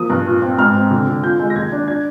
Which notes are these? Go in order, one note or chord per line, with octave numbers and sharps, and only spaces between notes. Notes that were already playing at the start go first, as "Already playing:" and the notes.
Already playing: F3 A#3 D#6
G2
A#2
C4
G#2 F6
C4
D3
D3
F4 G6
G#3
A#6
D#2 G#6
D4
D4 G#6